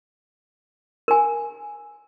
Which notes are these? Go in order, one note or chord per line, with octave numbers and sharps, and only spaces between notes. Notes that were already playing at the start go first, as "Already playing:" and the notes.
A#4 G#5